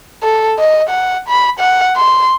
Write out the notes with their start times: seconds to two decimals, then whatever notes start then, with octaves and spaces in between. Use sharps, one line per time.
0.23 A4
0.59 D#5
0.89 F#5
1.29 B5
1.59 F#5
1.97 C6